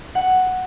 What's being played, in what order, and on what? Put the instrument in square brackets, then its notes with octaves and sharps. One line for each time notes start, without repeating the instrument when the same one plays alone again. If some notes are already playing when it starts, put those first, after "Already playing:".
[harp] F#5